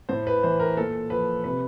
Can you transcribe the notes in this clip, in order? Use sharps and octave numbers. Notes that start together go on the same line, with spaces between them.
A2 C5
B4
E3 C5
A#4
A#2 A4
F3 B4
C3 B4